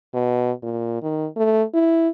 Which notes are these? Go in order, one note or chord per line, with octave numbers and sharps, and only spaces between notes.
B2
A#2
D#3
A3
E4